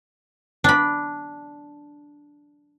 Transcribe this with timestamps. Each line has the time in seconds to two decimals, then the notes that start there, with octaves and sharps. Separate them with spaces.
0.64 D4 B5